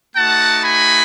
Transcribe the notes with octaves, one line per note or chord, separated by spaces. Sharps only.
A3 D#4 F#4 F#5 A5
G#5 B5